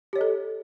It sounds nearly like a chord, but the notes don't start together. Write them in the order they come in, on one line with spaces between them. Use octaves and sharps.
G4 C#5 D#5 A4